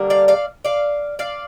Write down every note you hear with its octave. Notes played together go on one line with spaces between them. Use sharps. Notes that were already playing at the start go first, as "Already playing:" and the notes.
Already playing: D3 G3 A#3
D5 F5
D5 F5
D5 F5
D5 F5